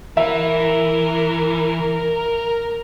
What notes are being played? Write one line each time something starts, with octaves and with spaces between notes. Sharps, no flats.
E3 A#4 E5